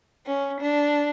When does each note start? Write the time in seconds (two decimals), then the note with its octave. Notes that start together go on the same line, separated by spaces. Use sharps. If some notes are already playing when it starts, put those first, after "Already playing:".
0.26 C#4
0.61 D4